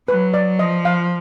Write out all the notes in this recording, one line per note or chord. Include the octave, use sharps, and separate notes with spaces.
F#3 B4
D5
F3 D#5
F5